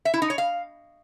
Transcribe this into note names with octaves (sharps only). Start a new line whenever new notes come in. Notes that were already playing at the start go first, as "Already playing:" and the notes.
E5
E4
D#4
C#5
F5